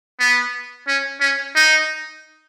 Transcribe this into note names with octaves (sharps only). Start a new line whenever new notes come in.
B3
C#4
C#4
D#4